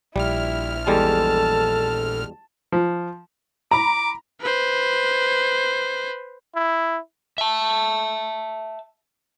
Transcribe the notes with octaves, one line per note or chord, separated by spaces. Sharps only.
A#1 G3 E4 F6
E2 G3 G#3 A4 A5
F3
A#5 B5 D6
B4 C5
E4
E5 A5